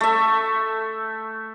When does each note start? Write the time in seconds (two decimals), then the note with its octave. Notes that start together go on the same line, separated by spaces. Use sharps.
0.01 A3 E5